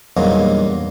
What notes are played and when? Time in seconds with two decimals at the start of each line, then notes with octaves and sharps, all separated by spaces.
0.17 E2 G2 A#2 F#3 A#3 D#4